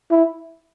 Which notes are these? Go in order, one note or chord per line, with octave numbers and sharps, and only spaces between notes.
E4